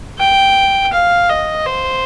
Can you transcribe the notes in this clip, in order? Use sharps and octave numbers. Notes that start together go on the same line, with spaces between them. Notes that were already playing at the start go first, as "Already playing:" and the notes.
G5
F5
D#5
C5